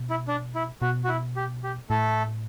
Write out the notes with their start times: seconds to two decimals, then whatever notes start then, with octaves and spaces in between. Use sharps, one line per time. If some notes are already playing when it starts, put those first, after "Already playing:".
Already playing: B2
0.10 E4
0.28 D4
0.55 E4
0.82 B2 F#4
1.04 F#4
1.09 E4
1.36 G4
1.63 G4
1.90 A2 A3 A4